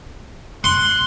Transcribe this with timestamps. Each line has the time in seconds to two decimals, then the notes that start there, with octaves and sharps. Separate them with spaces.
0.64 C6 F#6